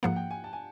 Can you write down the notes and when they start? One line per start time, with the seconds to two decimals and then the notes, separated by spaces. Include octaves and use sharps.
0.03 G#2 F3 A#3 F#5
0.16 G5
0.31 G#5
0.44 A5
0.53 G#5